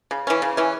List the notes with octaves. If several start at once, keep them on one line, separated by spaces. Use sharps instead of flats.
C#3
E3 C#4
C#3
E3 C#4